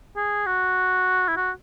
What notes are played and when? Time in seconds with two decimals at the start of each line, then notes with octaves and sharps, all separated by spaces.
0.16 G#4
0.46 F#4
1.28 E4
1.37 F#4